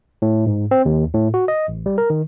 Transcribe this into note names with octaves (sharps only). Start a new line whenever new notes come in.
A2
G#2
C4
D#2
A2
F#4
D#5
A1
G3
A#4
D#3